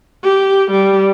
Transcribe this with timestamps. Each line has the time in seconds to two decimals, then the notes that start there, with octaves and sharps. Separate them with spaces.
0.23 G4
0.71 G3